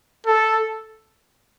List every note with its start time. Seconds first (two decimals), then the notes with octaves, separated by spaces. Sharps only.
0.27 A4